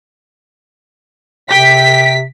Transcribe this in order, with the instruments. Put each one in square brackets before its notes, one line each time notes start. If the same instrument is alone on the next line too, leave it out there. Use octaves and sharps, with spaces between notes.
[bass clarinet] C3 [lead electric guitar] G4 G5 [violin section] B6